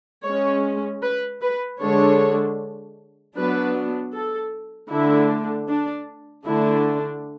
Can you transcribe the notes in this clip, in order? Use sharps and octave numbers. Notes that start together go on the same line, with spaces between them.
G#3 C#4 C#5
B4
B4
D3 G#3 D4 C#5
F#3 B3 D4 B4
A4
D3 A3 D4 E4
D4
D3 A3 D4 E4